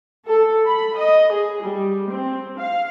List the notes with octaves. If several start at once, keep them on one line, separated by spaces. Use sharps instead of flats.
A4
B5
D#5
G#4
G3
C4
F5